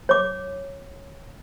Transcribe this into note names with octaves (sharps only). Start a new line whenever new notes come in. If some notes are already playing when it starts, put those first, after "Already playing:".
C#5 D6